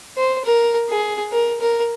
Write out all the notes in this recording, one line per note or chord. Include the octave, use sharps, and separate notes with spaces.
C5
A#4
G#4
A#4
A#4